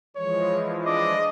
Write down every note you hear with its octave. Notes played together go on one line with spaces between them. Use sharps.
E3 F3 G#3 C#5
D4 D#5 D6